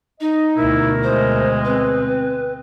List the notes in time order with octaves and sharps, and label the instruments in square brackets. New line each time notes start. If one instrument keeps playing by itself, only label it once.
[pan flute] D#4 [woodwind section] D#5
[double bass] D2 B2 [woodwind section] A3 A#4 [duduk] E4
[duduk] G#3 [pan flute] C5
[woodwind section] C4 [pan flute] B4